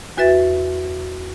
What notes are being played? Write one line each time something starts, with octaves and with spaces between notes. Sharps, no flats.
E2 F#4 B4 E5 A6